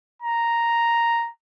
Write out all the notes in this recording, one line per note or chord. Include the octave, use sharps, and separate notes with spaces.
A#5